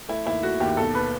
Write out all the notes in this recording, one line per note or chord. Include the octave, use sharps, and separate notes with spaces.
A3 E4
D#2 E4
A3 F#4
D#2 G4
B1 A4
B2 B4